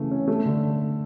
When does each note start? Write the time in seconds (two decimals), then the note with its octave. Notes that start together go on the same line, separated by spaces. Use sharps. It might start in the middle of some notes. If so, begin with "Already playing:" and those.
Already playing: C#3 E3 A3
0.11 C#4
0.28 A3
0.45 D3